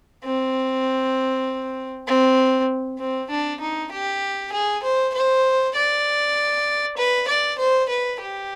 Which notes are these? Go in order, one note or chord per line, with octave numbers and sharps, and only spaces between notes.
C4
C4
C4
D4
D#4
G4
G#4
C5
C5
D5
B4
D5
C5
B4
G4